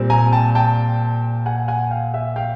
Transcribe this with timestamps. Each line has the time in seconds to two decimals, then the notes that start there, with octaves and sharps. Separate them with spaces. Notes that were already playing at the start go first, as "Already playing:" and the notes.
Already playing: A#2 G3 C4
0.10 G#5 A#5
0.32 G5 A5
0.55 G5 A5
1.46 F#5 G#5
1.68 F#5 G#5
1.91 F5 G5
2.14 E5 F#5
2.36 F5 G5